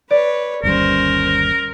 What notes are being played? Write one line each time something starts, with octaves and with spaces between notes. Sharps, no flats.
B4 C#5 D5
G1 D#2 G3 C#4 A#4 C5